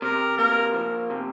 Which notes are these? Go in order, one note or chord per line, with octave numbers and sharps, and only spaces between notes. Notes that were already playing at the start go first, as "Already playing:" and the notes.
C3 A#4
A#3 A#4
F3
C3